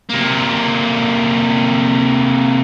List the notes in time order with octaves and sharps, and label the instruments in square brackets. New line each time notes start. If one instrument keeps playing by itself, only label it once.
[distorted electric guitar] C3 A#3